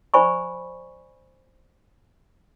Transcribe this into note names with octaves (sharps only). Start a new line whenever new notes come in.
C5 D5 G#5 B5 C#6